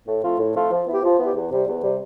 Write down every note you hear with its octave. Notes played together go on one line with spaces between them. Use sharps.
A2
F3 A3 C4 F4
A2
F3 A3 C4 F4
F3
B3 E4 G4
F3
B3 E4 G4
E2
C3 G3
E2
C3 G3